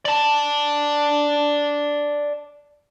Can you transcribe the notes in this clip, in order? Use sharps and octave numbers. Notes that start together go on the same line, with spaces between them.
D5 A5